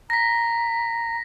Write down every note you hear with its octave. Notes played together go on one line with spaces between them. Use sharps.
A#5 A#6 B6